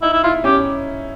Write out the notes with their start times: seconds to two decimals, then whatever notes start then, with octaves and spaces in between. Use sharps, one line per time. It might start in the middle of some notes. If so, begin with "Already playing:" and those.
0.02 D#4 E4
0.13 E4
0.23 E4 F4
0.44 C#4 G4